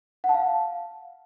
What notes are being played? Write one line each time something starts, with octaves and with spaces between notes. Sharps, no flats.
F#5
A5
F5